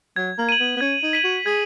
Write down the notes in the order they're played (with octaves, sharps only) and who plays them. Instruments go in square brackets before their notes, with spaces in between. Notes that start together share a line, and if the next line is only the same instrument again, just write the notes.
[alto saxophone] F#3 [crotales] G#6
[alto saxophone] A#3
[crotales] D#7 F#7
[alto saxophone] B3
B3
[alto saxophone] C#4 [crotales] G#6
[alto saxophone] D#4
[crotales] B6 D#7 F#7
[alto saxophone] F#4
[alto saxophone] G#4 [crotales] G#6